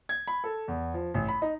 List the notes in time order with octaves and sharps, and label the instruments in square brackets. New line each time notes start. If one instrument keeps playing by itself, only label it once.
[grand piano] G#6
B5
A4
E2
F3
A1
B5
D#4